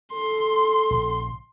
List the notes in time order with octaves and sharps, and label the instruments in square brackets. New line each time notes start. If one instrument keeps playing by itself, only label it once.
[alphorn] A4 [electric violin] C6
[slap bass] A#1 C#3